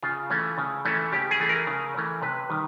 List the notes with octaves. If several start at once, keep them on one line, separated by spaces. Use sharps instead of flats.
C#3 F4
E3 A3 C#4
C#3
E3 A3 C#4
C#3 G4
G#4
E3 A3 C#4
A#4
C#3
E3 A3 C#4
C3 B4
D#3 G3